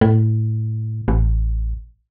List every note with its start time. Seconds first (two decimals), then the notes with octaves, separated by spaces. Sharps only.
0.01 A2
1.08 A1